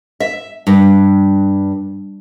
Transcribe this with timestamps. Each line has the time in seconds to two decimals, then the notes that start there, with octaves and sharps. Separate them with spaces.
0.20 E5
0.67 G2